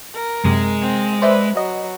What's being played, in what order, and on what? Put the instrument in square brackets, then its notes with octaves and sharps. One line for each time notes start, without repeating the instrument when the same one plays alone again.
[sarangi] A#4
[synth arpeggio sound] F#2 C3 [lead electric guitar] G#3
[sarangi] C4
[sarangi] B4 [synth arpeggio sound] C5 D5 E5
[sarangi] F#3 [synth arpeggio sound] D#5